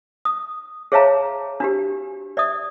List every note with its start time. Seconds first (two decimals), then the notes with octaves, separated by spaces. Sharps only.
0.25 D#6
0.92 G#4 C#5 E5 F5 A5 A#5
1.60 D4 F#4 G4
2.37 D5 E5 D#6